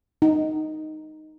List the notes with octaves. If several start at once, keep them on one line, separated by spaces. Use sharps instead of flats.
D#4